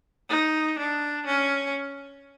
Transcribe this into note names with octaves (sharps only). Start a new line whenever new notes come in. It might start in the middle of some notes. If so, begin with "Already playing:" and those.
D#4
D4
C#4